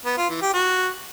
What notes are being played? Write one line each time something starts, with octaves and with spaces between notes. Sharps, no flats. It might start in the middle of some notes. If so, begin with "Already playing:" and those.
B3
F4
E3
G4
F#4